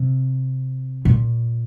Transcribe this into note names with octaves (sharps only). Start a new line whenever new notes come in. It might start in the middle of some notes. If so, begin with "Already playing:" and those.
Already playing: C3
A#2